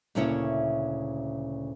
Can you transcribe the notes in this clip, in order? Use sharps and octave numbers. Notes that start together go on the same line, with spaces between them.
D2 A#2 C#3 C#4 E4 C#5